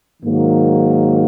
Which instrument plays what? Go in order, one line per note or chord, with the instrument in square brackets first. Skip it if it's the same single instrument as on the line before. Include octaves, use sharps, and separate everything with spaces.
[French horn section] G#2 D#3 F#3 A#3